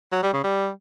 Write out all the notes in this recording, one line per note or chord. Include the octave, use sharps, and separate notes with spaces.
F#3
G3
C#3
G3